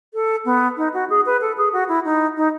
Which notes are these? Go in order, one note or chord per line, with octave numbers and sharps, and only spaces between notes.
A4
B3
D#4
F#4
G#4
B4
A4
G#4
F#4
E4
D#4
D#4